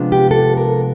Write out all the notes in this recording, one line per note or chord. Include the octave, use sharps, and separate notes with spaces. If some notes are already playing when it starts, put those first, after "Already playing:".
Already playing: C3 F3 G#3 B3 D4
G4
A4
A#4